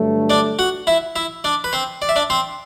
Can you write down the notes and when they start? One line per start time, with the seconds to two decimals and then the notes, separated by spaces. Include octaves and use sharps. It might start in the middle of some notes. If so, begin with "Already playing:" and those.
Already playing: G2 D3 F#3 A3
0.30 D4 D5
0.59 F#4 F#5
0.87 E4 E5
1.16 E4 E5
1.44 D4 D5
1.64 B4
1.73 C4 C5
2.02 D5
2.09 E5
2.16 D4 D5
2.30 C4 C5